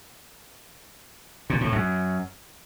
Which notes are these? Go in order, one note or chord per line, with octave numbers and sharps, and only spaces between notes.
A#2
A2
F#2